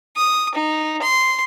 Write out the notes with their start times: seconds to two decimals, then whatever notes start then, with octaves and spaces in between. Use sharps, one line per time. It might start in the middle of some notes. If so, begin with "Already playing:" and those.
0.17 D#6
0.55 D#4
1.02 C6